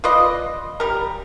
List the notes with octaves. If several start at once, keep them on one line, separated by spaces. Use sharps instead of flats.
F4 B4 D5 D#5
G3 A#4